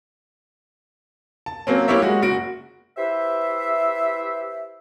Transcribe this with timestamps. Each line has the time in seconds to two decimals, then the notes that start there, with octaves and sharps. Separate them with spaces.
1.46 A5
1.67 F#3 A#3 C4 C#4
1.88 A#3 E4 G4 C#5 E5
2.02 G#3 F#4
2.22 F#1 F#4 D7
2.97 E4 G4 B4 C5 E5